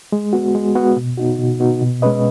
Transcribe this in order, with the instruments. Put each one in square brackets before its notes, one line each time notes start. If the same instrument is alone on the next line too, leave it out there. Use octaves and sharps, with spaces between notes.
[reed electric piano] G#3
B3 F#4
G#3
B3 F#4
B2
B3 D#4 F#4
B2
B3 D#4 F#4
B2
G#3 C#4 B4 D#5